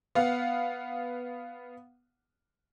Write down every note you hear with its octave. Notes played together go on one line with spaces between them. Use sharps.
B3 F5 F#5